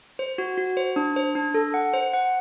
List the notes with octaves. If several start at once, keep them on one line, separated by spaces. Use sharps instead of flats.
C5
F#4
F#4
C5
D4
C5
D4
A4
F#5
C5
F#5